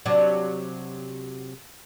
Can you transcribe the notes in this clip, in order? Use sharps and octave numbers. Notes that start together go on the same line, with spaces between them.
C3 F#3 D4